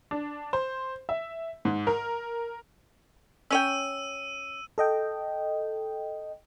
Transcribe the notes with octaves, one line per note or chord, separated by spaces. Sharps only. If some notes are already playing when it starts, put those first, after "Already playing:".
D4
C5
E5
G#2
A#4
C#4 C#5 G5 E6 D#7
A4 D#5 G5